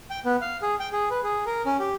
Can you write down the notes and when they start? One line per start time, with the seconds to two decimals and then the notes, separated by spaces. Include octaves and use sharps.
0.10 G5
0.25 B3
0.41 F5
0.62 G#4
0.80 G5
0.92 G#4
1.11 B4
1.24 G#4
1.46 A#4
1.65 C#4
1.79 G4